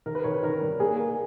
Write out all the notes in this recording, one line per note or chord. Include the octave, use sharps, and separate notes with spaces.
D#3 A#4
B4
D#3 C#5
B4
D#3 A#4
G3
A#3 G#4
A#3